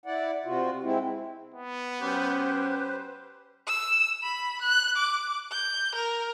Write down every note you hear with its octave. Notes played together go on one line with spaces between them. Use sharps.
E4 D5 F#5
C3 F4 F#4
G#3 C4 E4
B3
F#3 C#4 G4 B4 C5
E6
B5
F#6
D6
G6
A#4